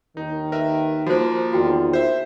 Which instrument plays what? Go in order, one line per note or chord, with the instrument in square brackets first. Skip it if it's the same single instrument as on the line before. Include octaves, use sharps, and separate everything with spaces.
[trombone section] D#2 D#3 [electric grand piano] D#4
[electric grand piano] A#4 B4 E5
[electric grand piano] F3 A#3 [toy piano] F#4 C5
[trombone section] E2 D#3 F4 [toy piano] F#4 G5
[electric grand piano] C5 E5